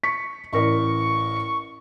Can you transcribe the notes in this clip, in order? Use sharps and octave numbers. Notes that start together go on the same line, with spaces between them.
C#6 B6 C#7
A1 A#4 D5 C#6